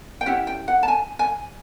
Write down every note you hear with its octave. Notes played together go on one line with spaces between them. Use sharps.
G5
C#4 E4 G4 F#5
G5
F#5
A5
G#5
G#5